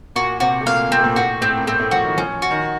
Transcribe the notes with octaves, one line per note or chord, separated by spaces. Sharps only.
A#2 A#3 F#4
C3 C4 F#4
A3
A#2 A#3 F5
A#2 A#3 C4
A3
A#2 A#3
A2 A3 F#4
A2 A3 C4
A#3
A2 A3 C4
A2 A3
F3 F#4
D#3
F3 C#4
F#4
D#3